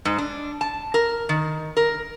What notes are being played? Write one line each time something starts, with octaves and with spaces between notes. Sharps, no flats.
G#2
D4
A5
A#4
D#3
A#4